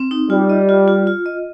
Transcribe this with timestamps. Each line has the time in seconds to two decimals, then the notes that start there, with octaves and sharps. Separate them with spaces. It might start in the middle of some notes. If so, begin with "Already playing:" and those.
Already playing: C4
0.11 D#4
0.30 G3 F4
0.50 D#5
0.69 F4
0.88 F4
1.07 F4
1.26 D#5